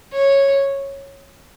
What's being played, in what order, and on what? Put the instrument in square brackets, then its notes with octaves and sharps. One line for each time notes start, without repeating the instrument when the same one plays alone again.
[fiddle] C#5